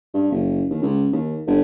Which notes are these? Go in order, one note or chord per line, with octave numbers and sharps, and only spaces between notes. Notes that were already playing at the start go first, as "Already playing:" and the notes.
G2
F#1
D#2
C#2
D#2
G1